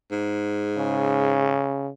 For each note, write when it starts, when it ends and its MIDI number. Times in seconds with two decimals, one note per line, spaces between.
0.11 1.58 44
0.77 1.89 49